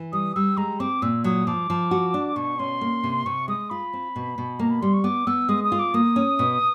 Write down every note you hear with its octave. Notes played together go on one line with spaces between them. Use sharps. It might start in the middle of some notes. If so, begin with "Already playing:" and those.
Already playing: E3
G3 D#6
G3 E6
G#3 A#5
C4 D6
A#2 E6
F#3 D#6
F3 D6
F3
F#4
D4
B2 C#6
C#4 C6
A#3
C3
C3 C#6
G#3 D#6
F4 B5
C4
B2
B2
A#3 A#5
B5
G3 C6
C#6
B3 D6
B3 E6
G#3 D#6
D#6
F4
D6
A#3 D#6
C#4
B2